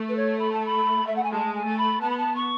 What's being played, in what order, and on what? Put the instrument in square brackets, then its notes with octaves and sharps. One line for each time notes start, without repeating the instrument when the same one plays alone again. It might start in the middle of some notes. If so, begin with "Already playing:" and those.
Already playing: [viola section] A3
[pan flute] B4
C#5
B5
A5
B5
E5
F#5
G#5
[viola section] G#3 [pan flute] A5
[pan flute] G#5
[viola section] A3
[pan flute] B5
[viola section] B3 [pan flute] A5
[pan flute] B5
A5
C#6